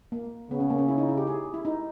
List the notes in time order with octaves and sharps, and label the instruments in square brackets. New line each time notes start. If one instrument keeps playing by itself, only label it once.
[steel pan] A#3
[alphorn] C#3 [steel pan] B3
[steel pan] C#4
A#3
C#4
E4
D#4
E4
G4
G#4
E4
D#4